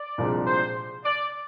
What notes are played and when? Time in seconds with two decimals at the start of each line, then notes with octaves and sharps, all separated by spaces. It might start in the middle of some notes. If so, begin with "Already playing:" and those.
Already playing: D5
0.18 C2 A#2 F3 G#3 D4
0.46 C5
1.04 D5